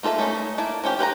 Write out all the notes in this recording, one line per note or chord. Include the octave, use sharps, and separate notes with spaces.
A#3 F4 A4 D5 E5
A3 C#4 D#4
A#3 E4 A5
F3 C#4 F4 G4
G4 B4 C5 A#5